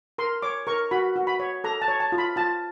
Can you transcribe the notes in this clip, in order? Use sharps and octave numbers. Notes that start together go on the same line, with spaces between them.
A#4 C6
C#5 D6
A#4 C#6
F#4 B5
F#4
B5
C#5
A4 A#5
A5
C#5
A5
F4
B5
F4 A5